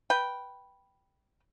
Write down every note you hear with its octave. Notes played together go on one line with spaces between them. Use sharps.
B4 G5